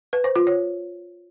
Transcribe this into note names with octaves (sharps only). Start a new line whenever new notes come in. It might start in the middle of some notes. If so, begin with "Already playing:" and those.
B4
C5
F4
C#5